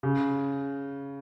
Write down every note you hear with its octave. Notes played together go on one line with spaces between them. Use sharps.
C#3